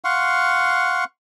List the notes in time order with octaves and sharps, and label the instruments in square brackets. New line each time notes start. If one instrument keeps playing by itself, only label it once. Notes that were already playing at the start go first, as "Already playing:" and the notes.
[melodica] F5 F#5 C6 C#6